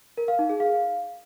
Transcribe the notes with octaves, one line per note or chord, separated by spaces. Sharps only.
A#4
F5
D#4
G#4
F5